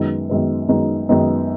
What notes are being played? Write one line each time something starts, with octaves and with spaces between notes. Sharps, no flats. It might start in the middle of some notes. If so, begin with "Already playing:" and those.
Already playing: F#2 D#3 G#3 B3 D#4
F#2 D#3 G#3 B3 D#4
F#2 D#3 G#3 B3 D#4
F#2 D#3 G#3 B3 D#4